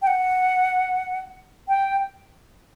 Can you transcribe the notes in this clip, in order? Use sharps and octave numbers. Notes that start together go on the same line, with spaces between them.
G5
F#5
G5